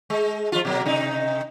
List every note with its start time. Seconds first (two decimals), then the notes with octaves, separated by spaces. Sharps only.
0.10 G#3
0.52 F3 F4
0.65 B2 F#3 A#3
0.86 C3 D#4